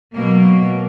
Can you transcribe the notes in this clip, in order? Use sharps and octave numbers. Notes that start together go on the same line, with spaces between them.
B2 F#3 A#3